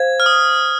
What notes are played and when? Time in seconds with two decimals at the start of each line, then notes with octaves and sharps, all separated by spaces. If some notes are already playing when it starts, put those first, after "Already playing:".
Already playing: C5 F5 G#6
0.20 F6
0.26 D#6